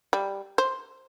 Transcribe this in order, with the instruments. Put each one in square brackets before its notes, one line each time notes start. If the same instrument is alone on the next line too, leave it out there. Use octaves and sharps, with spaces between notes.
[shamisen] G3
C5